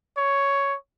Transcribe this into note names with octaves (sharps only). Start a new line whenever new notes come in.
C#5